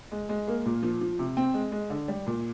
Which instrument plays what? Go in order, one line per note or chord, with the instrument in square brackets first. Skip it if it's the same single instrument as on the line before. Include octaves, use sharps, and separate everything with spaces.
[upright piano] G#3
G#3
A#3
A#2
F3
F3
C3
C4
G#3
G#3
D3
G3
A#2